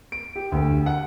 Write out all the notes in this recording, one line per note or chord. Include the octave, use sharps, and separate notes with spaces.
D7
G4
D2
F#5